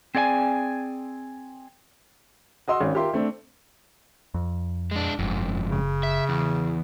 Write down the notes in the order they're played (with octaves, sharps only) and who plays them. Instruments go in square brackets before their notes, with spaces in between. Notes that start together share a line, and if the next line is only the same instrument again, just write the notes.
[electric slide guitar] C4 G#4 D5 F#5 G#5
[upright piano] F#4 D#5 C6 E6
G#1 C#4
F4 G4 A#4 E5 C6
A3 C4 D4
[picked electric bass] F2
[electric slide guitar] G#3 D4
[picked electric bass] F#1 [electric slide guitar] F2 G#2
[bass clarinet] C#3
[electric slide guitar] E5
E2